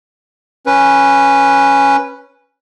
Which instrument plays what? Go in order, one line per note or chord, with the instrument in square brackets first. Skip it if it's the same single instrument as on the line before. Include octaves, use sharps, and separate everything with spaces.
[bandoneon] C#4 B4